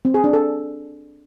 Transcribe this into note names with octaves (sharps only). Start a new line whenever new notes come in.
C4
G#4
D4
A4